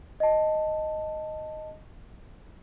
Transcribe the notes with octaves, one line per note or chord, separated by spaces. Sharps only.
D#5 A5